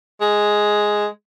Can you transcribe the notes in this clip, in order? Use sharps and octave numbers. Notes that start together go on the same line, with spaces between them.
G#3